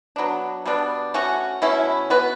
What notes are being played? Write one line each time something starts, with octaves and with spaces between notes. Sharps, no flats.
F#3 B3 D4
B2 G3 B3 D4
A3 C#4 F#4
B2 A3 C#4 E4
B3 F#4 B4